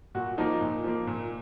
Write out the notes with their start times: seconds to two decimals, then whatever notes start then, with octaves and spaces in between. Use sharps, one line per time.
0.15 A#2 F#4
0.38 F3 A#3 D#4
0.61 A#2
0.84 F3 A#3
1.07 A#2